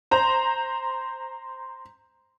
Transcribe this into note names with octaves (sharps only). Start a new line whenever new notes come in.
C5 A#5